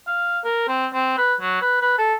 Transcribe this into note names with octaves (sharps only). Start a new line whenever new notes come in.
F5
A#4
C4
C4
B4
F#3
B4
B4
A4